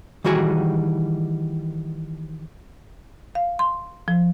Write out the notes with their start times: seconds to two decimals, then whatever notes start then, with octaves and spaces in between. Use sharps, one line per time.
0.24 D#3 E3 G3 F#4 G#4 G#5
3.35 F5
3.59 C6
4.08 F3